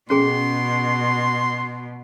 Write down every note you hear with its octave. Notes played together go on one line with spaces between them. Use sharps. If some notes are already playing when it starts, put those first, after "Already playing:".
B2 C#4 G#4 G5 C6